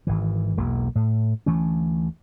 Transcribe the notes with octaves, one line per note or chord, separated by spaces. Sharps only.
G#1 E3
E1 B1 A#3
A2
D2 E3 A3 C#4